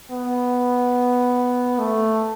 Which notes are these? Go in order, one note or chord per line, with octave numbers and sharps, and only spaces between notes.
B3
A3